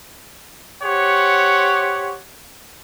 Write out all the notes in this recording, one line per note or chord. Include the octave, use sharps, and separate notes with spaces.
G4 C5 C#5 F#5